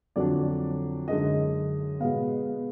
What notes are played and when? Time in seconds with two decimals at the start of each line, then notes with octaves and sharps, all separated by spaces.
0.16 F2 D3 F#3 D4 D5
1.07 F#2 D3 G#3 D#4 D#5
2.00 B2 G#3 B3 F5